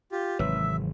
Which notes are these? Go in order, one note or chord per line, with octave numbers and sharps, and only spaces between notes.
F4 G4
G#1 C3 E3 F#3 E5 E6